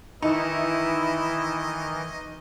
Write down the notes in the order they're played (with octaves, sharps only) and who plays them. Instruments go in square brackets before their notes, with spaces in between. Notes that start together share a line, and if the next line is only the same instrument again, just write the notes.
[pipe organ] D#3 E3 [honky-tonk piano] D#4 [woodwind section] E4 [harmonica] D#5